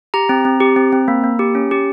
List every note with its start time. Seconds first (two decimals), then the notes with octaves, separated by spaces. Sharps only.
0.14 G4 A#5
0.29 C4
0.45 C4
0.60 G4
0.76 C4
0.93 C4
1.08 A#3
1.24 A#3
1.39 G4
1.55 C#4
1.71 G4